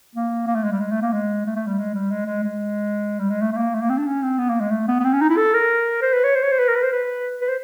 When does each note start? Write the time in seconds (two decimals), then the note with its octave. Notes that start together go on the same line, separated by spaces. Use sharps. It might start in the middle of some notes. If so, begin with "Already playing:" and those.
0.15 A#3
0.47 A#3
0.55 A3
0.64 G#3
0.72 G3
0.80 G#3
0.91 A3
1.02 A#3
1.13 G#3
1.46 A3
1.56 A3
1.67 G3
1.79 G#3
1.94 G3
2.11 G#3
2.26 G#3
2.44 G#3
3.19 G3
3.30 G#3
3.41 A3
3.52 A3
3.57 A#3
3.74 A3
3.82 A#3
3.89 C4
3.98 D4
4.06 C#4
4.23 C4
4.38 B3
4.49 A#3
4.61 G#3
4.71 A3
4.88 B3
5.00 B3
5.04 C4
5.13 C#4
5.21 D#4
5.29 E4
5.37 A4
5.54 A#4
6.02 C5
6.13 B4
6.24 C#5
6.35 C5
6.43 C#5
6.51 C5
6.59 B4
6.68 A#4
6.76 B4
6.83 C5
6.92 B4
7.41 B4
7.48 C5